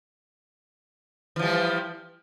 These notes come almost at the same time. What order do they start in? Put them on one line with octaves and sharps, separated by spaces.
E3 F3 G3